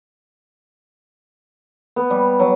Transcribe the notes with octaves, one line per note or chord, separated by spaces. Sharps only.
B3
G3
F#3